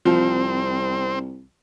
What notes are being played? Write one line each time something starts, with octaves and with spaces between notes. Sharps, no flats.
C2 F3 C4